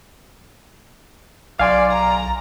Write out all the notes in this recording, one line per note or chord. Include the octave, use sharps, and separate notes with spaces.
B1 D5 F5 G#5 C6
A#5